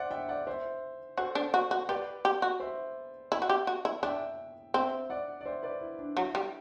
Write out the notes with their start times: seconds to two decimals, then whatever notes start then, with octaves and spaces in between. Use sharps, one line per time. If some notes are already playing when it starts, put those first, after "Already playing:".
Already playing: C5 D5 E5 F#5
0.11 E5 G5
0.29 D5 F#5
0.47 C5 E5
1.18 F#4 A4 C5
1.35 D4
1.54 F#4
1.71 F#4
1.89 G4 B4 D5
2.25 G4
2.42 F#4
2.60 C5 E5
3.32 E4 E5 G5
3.42 F#4
3.49 G4
3.67 F#4
3.85 E4
4.03 D4 E5 G5
4.74 C4 E5 G5
5.10 D5 F#5
5.41 D5
5.45 C5 E5
5.63 B4 D5
5.81 E4
5.99 D4
6.17 F#3 E4
6.35 G3